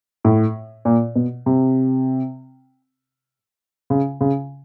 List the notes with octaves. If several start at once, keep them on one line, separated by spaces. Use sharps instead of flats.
A2
A#2
B2
C3
C#3
C#3